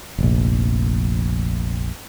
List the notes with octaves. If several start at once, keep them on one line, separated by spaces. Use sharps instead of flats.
F1 A#1